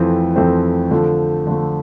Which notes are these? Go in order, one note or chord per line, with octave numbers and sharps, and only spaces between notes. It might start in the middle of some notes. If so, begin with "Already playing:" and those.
Already playing: F2 E3 A3 C4
F2 E3 A3 C4
D3 F3 A3
D3 F3 A3